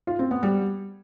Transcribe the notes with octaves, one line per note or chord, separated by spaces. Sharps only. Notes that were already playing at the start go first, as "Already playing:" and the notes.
F4
C4
B3
G3